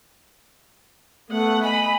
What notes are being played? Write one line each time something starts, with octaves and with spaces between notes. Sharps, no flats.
A3 B3 F#5
D#5 G#5 B5